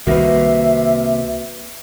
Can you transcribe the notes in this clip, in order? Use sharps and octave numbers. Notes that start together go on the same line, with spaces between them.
C2 C3 D#3 A#3 F#4 B4 E5